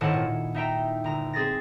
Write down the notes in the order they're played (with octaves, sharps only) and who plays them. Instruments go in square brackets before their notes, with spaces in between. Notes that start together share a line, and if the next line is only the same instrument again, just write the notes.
[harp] G#1 A2 E4 D#5 F#5 A5
A#2
D#4 E5 G5 A#5
G1 A#5
C4 G#4 A6 A#6